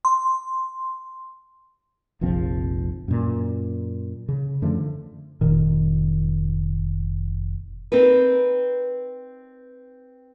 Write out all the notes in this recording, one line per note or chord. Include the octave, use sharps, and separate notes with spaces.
C6
F1 A#1 F3 C4
F#2 A#2
C#3
F#2 D3 F3 A3
F1 A#2 D#3
C4 D#4 A#4 B4